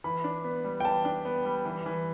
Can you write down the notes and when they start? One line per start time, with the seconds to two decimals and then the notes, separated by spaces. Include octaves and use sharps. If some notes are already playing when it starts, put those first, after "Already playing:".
0.04 E3 B5
0.24 D4
0.44 B3
0.64 G3
0.80 G5
0.85 E3 A5
1.05 D4
1.25 B3
1.45 G3
1.65 E3
1.86 E3